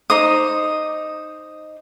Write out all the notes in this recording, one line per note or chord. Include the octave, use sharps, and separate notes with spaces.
D#4 C5 D#6